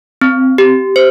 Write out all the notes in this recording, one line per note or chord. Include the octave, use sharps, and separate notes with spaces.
C4
G4
C5